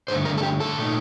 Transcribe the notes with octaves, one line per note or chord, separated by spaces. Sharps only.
G2 D3 A3 C5
A#4
A4
G4
A4
A#2 A3 D#4